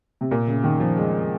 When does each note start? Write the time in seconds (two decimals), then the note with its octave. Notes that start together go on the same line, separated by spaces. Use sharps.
0.21 C3
0.31 A#2
0.48 C#3
0.64 D#3
0.80 F3
0.97 G#3